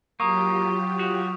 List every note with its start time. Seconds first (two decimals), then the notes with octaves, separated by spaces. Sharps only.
0.20 F#3 A#3 F4 G4 C#6 D#6
0.99 F#4 D#6 F7